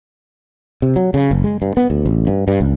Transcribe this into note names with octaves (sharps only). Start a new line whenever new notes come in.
C3
F#3
C#3
F#1
G#3
G2
B3
D2
A1
G2
G2
C#2